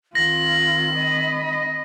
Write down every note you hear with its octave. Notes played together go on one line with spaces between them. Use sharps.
D#3 C4 F4 A#6 F#7
D#5 B5